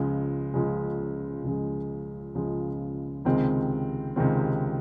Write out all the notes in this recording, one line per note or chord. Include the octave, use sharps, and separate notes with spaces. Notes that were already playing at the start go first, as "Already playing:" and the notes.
Already playing: C#2 C#3 F3 G#3
C#2 C#3 F3 G#3
C#2 C#3 F3 G#3
C#2 C#3 F3 G#3
C#2 C3 D#3 G#3 C4
C#2 C3 D#3 G#3 C4